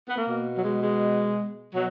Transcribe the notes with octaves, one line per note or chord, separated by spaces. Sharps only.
B3
A#3
B2
F#3
G#3
G#3
B2 F#3